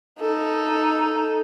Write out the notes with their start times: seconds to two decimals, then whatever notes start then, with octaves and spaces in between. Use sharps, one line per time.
0.21 D#4 A4